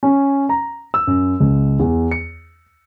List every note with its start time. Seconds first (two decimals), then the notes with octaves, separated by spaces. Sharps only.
0.03 C#4
0.49 A#5
0.94 E6
1.07 F#2
1.40 C#2
1.79 E2
2.11 C#7